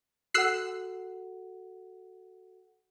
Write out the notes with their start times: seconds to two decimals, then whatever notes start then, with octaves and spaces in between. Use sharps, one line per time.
0.34 F#4 A4 F#5 E6 F#6 C7